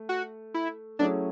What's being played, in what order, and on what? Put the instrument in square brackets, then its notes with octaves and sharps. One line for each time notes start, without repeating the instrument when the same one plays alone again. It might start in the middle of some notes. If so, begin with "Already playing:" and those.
Already playing: [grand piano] A3
[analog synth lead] F#4
E4
[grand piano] F#3 A3 C#4 E4 G#4 [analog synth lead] D4